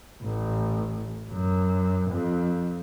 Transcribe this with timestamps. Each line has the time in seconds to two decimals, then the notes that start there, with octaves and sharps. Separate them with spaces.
0.23 A1
1.31 F#2
2.10 F2